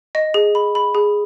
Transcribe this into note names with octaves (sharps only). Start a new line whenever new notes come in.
D#5
G#4
B5
B5
G#4